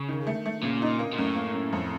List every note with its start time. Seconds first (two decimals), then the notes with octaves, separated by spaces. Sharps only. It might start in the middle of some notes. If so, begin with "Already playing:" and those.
Already playing: C#3
0.09 D#3
0.27 A3
0.46 A3
0.63 A#2 C#3
0.82 D#4
0.99 A#3
1.13 A#2
1.18 F#2 A2
1.35 A#3
1.54 F#2
1.73 F2